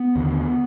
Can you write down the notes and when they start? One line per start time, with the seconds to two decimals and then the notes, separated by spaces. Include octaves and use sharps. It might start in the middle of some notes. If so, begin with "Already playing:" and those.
Already playing: B3
0.15 D#2 D3